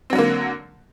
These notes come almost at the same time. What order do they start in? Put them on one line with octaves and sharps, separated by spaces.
C4 F#3 D3 A#3